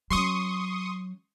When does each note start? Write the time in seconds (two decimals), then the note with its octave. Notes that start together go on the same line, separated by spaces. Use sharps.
0.10 F#3 C#4 C6 C#6 D#6